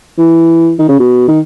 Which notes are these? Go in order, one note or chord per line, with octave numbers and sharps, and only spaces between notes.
E3
D#3
C#3
B2
D#3